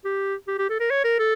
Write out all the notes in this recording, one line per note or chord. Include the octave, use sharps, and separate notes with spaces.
G4
G4
G4
A4
A#4
C#5
A#4
A4